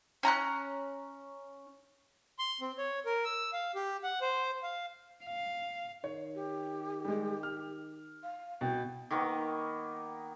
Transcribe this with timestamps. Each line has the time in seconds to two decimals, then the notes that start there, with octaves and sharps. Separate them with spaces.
0.23 C#4 A#5 B5 F#6
2.39 C6
2.61 C4
2.78 C#5
3.06 A#4
3.25 E6
3.53 F5
3.75 G4
4.04 F#5
4.21 C5
4.63 F5
5.24 F5
6.04 D#3 C#5
6.35 G4
7.05 G3 G#3
7.43 F6
8.23 F5
8.61 C2 B2 G5
9.11 D#3 A#3 B3 C#6